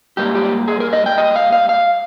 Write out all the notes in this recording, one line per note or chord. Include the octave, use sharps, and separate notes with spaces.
G#2 G3 A#3 G4
G4
G#4
A#4
D#5
G5
D#5
F5
F5
F5